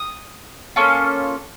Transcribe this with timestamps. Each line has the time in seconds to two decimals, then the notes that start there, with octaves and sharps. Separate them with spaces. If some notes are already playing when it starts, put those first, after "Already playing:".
Already playing: D#6
0.76 A#3 C#4 F4 A4